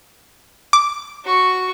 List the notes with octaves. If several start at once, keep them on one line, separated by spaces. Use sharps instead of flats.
D6
F#4 C#6